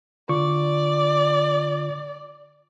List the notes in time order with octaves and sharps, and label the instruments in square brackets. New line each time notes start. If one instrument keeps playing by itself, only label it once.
[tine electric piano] D3 F4 C#6 [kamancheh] D5